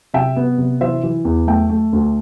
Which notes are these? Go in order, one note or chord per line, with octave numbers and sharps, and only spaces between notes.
C3 E5 G5
B3
C3
E3 C5 E5
E3
E2
A3 E5 G5
A3
D2